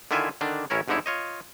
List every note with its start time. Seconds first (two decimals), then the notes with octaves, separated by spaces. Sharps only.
0.11 D3 D#3 E4 F4 E5 G#5
0.41 D3 D#3 D4
0.70 A1 C#4 E4 A#4 C#5
0.88 G1 G#2 D3 D#4 E4 C#5
1.06 F4 C#5 D#5